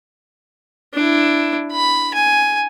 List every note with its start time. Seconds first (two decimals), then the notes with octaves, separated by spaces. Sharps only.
0.94 D4 E4
1.72 B5
2.14 G#5